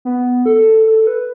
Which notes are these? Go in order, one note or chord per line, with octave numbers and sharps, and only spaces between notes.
B3
A4
A4
B4